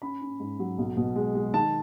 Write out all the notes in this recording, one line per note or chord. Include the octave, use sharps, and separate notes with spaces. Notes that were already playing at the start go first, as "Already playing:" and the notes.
C#4 B5
C#4
G#2
F#3
B1
B2
G#3
G#3
D#3 A5